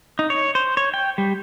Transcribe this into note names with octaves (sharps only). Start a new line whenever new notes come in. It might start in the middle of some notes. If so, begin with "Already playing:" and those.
D#4
C#5
C5
C#5
G5
G3